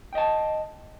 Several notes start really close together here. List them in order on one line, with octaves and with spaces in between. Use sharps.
G5 D#5 A5